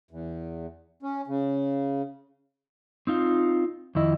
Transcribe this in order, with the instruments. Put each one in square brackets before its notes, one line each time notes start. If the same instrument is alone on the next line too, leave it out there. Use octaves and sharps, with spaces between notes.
[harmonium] E2
C#4
C#3
[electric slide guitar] C4 D#4 F4
F2 D#3 E4 D#5